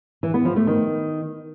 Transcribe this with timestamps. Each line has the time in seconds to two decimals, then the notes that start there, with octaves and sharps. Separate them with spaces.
0.23 E3
0.34 B3
0.45 F3
0.56 A3
0.67 D#3